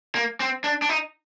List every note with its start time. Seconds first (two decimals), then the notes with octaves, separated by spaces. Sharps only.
0.15 A#3
0.40 C4
0.64 D4
0.82 D4
0.89 D#4